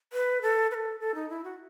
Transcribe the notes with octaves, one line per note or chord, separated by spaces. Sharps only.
B4
A4
B4
A4
A4
D#4
E4
F#4